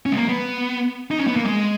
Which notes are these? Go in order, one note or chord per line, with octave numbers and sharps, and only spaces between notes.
C#4
G#3
A#3
B3
D#4
C#4
B3
A#3
G#3